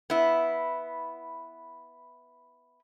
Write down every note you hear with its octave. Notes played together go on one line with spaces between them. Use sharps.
B3 E4